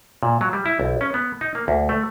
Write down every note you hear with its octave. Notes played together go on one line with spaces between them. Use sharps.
A#2
F#3
G3
E4
B1
C#4
B3
D#4
A#3
D2
A3